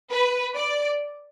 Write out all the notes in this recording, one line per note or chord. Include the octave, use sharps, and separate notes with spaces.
B4
D5